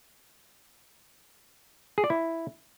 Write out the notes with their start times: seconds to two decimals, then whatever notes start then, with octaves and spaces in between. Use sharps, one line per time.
1.98 G#4
2.04 D5
2.10 E4